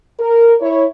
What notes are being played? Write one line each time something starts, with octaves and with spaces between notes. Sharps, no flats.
A#4
E4 C#5